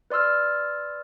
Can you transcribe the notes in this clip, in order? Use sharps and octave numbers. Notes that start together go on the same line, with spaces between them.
B4 D5 C6 E6 F6